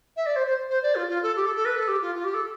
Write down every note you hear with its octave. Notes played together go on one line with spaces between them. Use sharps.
E5
D5
C5
C5
C5
D5
F4
F4
A4
G4
A4
A4
B4
A4
G4
F4
F4
G4
A4